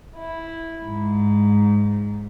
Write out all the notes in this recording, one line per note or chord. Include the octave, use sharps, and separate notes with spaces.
E4
G#2